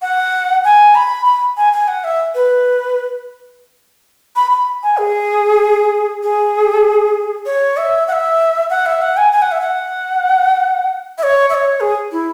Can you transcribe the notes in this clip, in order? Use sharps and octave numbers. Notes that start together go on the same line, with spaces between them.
F#5
G#5
B5
B5
G#5
G#5
F#5
E5
B4
B5
B5
G#5
G#4
G#4
C#5
E5
F#5
E5
F#5
E5
F#5
G#5
G#5
F#5
E5
F#5
E5
C#5
E5
C#5
G#4
E4